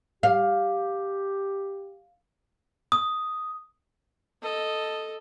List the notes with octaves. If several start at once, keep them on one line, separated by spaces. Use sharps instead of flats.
G4 F5
D#6
A4 D#5